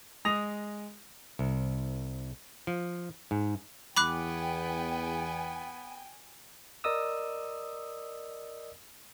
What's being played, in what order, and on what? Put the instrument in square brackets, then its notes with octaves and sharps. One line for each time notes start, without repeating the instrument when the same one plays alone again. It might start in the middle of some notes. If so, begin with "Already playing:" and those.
[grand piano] G#3 D#6 A#6 F7
[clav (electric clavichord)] C2
F3
G#2
[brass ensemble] E2 [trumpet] B3 [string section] G5 G#5 [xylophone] B5 D6 F#6
[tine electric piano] A#4 D5 D#5 D#6 E6